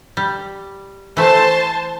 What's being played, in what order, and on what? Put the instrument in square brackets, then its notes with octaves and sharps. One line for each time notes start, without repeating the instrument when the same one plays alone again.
[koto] G3
[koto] E3 A3 [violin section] C5 A5